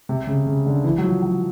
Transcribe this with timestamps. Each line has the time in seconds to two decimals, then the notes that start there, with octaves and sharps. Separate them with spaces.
0.09 C3
0.27 C#3
0.46 C#3
0.66 D3
0.84 E3
0.98 F#3
1.04 F3
1.22 F#3